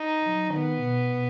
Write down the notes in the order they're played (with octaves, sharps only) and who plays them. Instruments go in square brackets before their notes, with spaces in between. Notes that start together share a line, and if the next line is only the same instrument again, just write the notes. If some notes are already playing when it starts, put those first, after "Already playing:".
Already playing: [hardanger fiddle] D#4
[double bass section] F#3
[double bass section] D#3 [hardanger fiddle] B3
[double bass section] B2